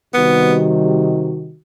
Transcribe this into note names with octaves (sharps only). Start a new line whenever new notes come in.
C3 D#3 G3 B3 D#4 F#4